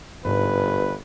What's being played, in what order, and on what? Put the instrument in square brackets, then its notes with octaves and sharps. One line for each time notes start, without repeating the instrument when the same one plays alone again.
[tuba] G1 [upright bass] G#2 F4 [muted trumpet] B4